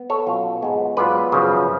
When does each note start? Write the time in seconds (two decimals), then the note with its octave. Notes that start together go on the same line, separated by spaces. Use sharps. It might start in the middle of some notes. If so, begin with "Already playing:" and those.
Already playing: B3
0.10 A4 C#5
0.27 B2 F#3 C#4 F4
0.62 G#2 G#3 B3
0.97 G#2 F#3 B3 F4 B4 D5
1.32 F#2 C#3 F3